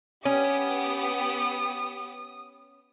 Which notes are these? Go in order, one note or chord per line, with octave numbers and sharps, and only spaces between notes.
B3 C#4 G4 D#6